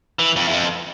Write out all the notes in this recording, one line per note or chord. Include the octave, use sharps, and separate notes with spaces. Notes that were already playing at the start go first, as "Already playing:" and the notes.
E3
F2
E2
F2